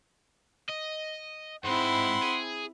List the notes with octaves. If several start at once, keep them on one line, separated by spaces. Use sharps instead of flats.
D#5
G#2 G#3 C4 E4 F#5 B5 C6
G#4